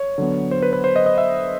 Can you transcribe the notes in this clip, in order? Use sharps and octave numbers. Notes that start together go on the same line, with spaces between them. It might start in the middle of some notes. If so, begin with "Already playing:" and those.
Already playing: C#5
D3 F#3 B3
C5
B4
B4
C5
D#5
D#5
E5